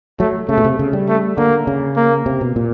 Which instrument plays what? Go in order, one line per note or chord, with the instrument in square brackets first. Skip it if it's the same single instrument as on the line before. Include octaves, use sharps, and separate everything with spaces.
[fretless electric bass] F#3 [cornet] A3
[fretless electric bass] C#3 [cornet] A3
[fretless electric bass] B2
C3
C#3
G3
[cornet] A3
[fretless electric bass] D3 [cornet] A#3
[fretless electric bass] C#3
[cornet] A#3
[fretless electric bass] C3
B2
A#2